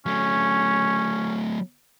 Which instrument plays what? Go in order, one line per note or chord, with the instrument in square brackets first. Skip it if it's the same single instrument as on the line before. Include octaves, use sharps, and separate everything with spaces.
[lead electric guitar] F#3 A3 [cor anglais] C#4